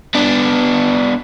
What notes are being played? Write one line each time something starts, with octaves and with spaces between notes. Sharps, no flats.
B3 D4